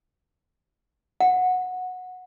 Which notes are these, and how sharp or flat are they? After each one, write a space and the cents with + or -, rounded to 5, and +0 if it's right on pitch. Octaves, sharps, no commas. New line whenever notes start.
F#5 -10